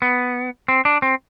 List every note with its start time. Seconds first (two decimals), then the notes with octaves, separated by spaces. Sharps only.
0.02 B3
0.68 C4
0.85 D4
1.02 C4